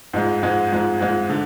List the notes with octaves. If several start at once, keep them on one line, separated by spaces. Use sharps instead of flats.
G#2 F3 G#3
G#2 F3 G#3
G#2 F3 G#3
G#2 F3 G#3
D3